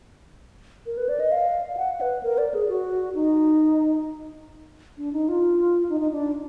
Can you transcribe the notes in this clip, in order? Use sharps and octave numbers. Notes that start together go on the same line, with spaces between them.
A#4
B4
D5
D#5
F5
F#5
B4
A#4
D5
G#4
F#4
D#4
D4
D#4
F4
D#4
D#4
D4